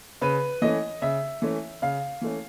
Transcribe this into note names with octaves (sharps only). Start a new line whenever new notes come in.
C#3 B4
E3 A3 C#4 D#5
C#3 E5
E3 A3 C#4
C#3 F5
E3 A3 C#4